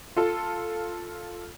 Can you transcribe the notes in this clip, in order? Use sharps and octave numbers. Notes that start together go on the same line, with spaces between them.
F4 A4 A5